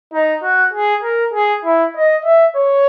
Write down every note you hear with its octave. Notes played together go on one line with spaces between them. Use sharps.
D#4
F#4
G#4
A#4
G#4
E4
D#5
E5
C#5